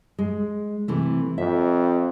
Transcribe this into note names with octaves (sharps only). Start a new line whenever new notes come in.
G#3
C3 E3 A3
F2 E5